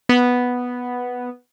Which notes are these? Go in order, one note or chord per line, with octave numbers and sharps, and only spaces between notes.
B3